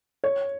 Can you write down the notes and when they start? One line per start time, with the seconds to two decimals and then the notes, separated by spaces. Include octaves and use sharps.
0.24 C#5